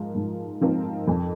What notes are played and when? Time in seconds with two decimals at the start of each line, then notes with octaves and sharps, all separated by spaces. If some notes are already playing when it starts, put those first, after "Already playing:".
Already playing: G#2 F3 D#4 A#4
0.15 G#2
0.61 F3 C4 D#4 A#4
1.07 F2